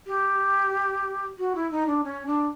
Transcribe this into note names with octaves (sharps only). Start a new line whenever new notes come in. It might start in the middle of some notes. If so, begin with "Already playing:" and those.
G4
F#4
E4
D#4
D4
C#4
D4